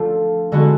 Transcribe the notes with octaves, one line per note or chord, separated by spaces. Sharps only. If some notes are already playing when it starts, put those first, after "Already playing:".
Already playing: F3 A3 D4 F4
D3 G#3 B3 F#4